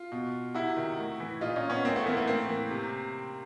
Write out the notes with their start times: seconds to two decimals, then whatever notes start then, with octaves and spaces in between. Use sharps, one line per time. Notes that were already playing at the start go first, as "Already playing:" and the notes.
Already playing: F4
0.12 B2
0.55 C3 E4 F#4
0.77 D#3
0.98 A2
1.20 E3
1.41 A#2 D#4 F4
1.56 C#4 D#4
1.70 B3 C#4
1.84 A2 A#3 C4
1.96 A3 B3
2.06 E3 A#3 C4
2.17 A3 B3
2.27 A2 A#3 C4
2.49 E3
2.71 C3